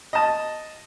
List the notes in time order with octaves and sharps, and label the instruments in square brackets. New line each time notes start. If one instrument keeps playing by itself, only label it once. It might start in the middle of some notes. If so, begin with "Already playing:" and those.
[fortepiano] D#5 A5